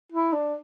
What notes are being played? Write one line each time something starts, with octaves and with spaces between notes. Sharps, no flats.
E4
D4